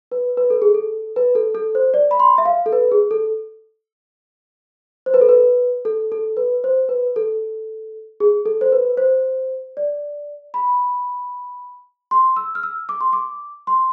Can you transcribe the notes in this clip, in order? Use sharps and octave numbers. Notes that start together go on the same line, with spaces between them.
B4
B4
A4
G#4
A4
B4
A4
A4
C5
D5
B5
C6
E5
F5
A4
B4
G#4
A4
C5
B4
A4
B4
A4
A4
B4
C5
B4
A4
G#4
A4
C5
B4
C5
D5
B5
C6
E6
F6
E6
D6
C6
D6
C6